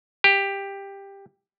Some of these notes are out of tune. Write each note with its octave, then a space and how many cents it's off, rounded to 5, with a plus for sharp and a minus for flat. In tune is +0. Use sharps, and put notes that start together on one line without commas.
G4 +10